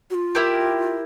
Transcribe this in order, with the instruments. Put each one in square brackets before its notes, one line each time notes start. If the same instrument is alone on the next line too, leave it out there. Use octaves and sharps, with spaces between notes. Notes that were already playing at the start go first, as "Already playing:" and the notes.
[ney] F#4
F4
[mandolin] E4 G4 A#4